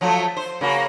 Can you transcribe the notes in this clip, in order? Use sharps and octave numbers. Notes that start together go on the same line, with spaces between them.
F3 F#3 A3
C5
C#3 A#3 F#4